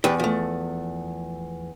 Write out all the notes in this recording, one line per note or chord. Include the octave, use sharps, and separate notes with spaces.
E2 G4 B4 D5
F3 A3